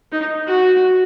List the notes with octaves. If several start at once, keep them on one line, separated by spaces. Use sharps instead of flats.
D#4
F#4